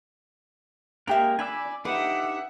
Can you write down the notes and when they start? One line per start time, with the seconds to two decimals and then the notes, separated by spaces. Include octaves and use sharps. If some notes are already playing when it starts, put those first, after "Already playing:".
1.07 G#3 A#3 D4 G4 A#4 E5
1.39 D4 D5 G#5 B5 E6
1.85 D4 D#4 G4 B4 E5 F#5